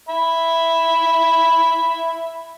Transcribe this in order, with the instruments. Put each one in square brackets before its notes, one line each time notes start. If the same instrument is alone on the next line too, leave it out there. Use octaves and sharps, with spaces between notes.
[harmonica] E5 B5